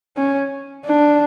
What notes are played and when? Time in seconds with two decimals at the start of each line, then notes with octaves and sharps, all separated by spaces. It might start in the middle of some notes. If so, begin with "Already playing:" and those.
0.17 C#4
0.85 D4